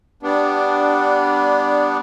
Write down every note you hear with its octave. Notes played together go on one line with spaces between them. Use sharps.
G3 B3 D4